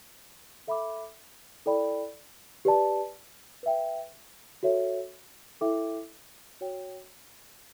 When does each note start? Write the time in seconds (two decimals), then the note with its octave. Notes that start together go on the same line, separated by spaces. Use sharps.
0.67 A4 E5 B5 D6
1.66 E4 A4 D5 G5 B5
2.65 G4 B4 D5 A5
3.63 B4 E5 G5
4.63 F#4 A4 C#5 E5
5.61 E4 A4 E5 G5 D6
6.61 F#4 C#5 G5